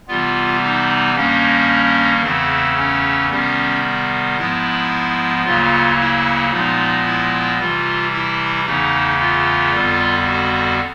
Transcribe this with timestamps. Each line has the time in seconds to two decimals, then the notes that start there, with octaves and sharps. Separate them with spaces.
0.08 C3 E3 G3 B3 F4
0.62 D#4
1.15 G2 D#3 G3 A#3 C#4
2.22 E2 C#3 E3 A3 C4
2.77 C#4
3.29 C3 D#3 G3 B3 C#4
4.37 G#2 F3 G#3 B3 E4
5.44 D2 C#3 F#3 A#3 F4
5.98 E4
6.51 A#2 F3 G#3 B3 D#4
7.05 E4
7.59 C3 E3 G3 F4
8.12 E4
8.65 E2 C#3 E3 A3 D#4
9.19 F4
9.73 F2 D3 G3 B3
10.26 F#4